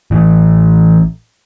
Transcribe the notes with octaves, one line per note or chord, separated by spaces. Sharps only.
A1 E3